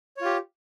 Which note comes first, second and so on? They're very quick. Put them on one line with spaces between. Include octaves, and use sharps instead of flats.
C#5 F4 G4